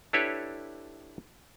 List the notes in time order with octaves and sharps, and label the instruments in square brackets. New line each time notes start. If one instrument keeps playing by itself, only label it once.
[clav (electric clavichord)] D4 E4 G4 A4 B4 C#5